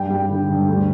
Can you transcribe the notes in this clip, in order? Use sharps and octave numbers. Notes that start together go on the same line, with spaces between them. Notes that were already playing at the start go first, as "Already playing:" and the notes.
Already playing: G2 G5
G3
D3
G2
D2